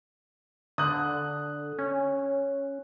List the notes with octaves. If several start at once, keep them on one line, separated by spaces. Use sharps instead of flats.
D3 D#6 F#6
C#4